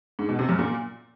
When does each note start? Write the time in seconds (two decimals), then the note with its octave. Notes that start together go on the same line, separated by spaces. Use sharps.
0.19 G#2
0.29 B2
0.39 C3
0.49 F#2
0.59 A#2